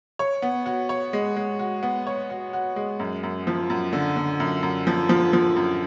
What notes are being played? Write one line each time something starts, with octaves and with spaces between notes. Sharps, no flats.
C#5
B3
F#4
C#5
G#3
G#3
F#4
B3
C#5
F#4
F#4
G#3
F#2
F#2
F3
F#2
D3
D3
F#2
F#2
F3
F3
F3
F#2